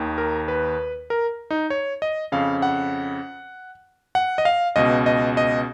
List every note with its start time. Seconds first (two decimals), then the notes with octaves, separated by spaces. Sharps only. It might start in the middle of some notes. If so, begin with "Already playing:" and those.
Already playing: D#2 D#3
0.18 A#4
0.48 B4
1.10 A#4
1.51 D#4
1.70 C#5
2.02 D#5
2.32 F2 C#3 F5
2.62 F#5
4.15 F#5
4.38 D#5
4.45 F5
4.76 C#2 B2 D#5
5.06 D#5
5.37 D#5